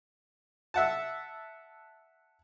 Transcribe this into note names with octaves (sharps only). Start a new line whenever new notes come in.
E5 F#5 A5